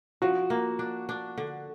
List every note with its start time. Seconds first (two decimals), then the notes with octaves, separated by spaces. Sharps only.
0.22 F3 F#4
0.50 A#3
0.79 D4
1.09 D4
1.38 D3